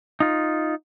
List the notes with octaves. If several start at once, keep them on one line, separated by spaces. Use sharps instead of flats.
D#4 F4